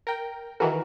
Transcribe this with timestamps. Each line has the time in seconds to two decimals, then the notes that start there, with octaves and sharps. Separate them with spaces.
0.07 A#4 G5
0.60 D#3 E3 F#4 A#4